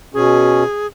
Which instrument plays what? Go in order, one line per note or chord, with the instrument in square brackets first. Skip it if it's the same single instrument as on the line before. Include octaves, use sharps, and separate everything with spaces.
[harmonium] B2 C#4 [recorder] G#4